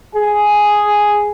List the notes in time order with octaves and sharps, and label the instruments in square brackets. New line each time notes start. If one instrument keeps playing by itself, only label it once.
[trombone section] G#4